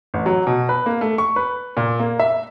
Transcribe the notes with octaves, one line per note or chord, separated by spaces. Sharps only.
A1
F#3
B2
B4
A#3
A3
C#6
B4
A#2
A#3
E5